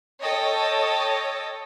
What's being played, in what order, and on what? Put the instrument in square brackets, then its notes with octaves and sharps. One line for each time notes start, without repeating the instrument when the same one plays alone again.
[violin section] A4 C#5 D#5 G5